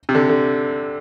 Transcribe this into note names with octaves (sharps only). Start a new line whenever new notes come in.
C3
D3
D3